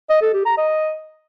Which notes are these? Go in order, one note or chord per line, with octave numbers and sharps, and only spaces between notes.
D#5
A4
G4
A#5
D#5